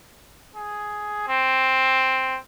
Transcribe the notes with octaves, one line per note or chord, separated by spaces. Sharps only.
G#4
C4